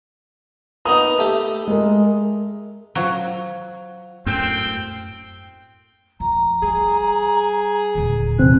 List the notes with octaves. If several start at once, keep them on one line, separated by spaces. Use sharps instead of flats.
A#3 B3 D#4 D#6
A3 G4
G#3 A#4
F#3 F4 C5 F5
F#2 A2 C4 G5 G6 E7
F2 A#5
G3 G#4
D#1 D3
E2 C3 F#3 B3 C4 F#6